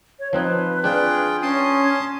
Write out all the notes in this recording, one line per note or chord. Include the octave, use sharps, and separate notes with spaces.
C#5
F3 C4 D#4 B4
D4 F4 G#4 G5
C#4 A5 C6 D#6